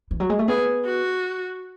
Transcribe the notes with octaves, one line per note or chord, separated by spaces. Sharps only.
E3
F#3
G#3
A3
B3 G#4
F#4